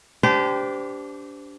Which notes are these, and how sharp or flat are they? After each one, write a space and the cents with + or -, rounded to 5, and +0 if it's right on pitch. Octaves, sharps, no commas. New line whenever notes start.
D4 -30 G4 +0 C5 -35